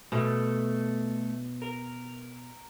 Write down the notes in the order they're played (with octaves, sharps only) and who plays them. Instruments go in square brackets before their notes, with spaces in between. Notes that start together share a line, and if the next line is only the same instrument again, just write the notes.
[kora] B2 [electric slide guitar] A3
[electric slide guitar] A#4